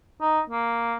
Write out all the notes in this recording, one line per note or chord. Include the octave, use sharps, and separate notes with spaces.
D#4
A#3